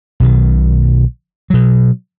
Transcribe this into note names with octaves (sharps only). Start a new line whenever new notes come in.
B1 B2 D#3
B2 F#3